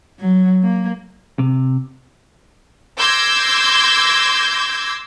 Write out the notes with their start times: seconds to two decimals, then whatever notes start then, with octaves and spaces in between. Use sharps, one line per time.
0.20 F#3
0.63 A#3
1.39 C3
2.97 C6 D6 E6 G6 G#6 A#6